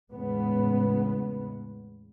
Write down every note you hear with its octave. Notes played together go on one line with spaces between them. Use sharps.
E2 A2 C#3 G#3 B3